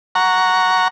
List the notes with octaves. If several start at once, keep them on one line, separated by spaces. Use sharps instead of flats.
F#5 A#5 C#6